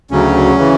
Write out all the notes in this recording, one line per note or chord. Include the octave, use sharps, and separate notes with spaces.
D2 C#3 F#3 C#4
C#3 E3